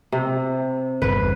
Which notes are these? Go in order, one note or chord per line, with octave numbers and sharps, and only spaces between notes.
C3
G1 E2 C#3 B4